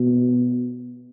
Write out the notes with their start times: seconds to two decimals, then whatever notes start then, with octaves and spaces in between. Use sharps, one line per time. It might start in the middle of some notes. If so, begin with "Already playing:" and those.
Already playing: B2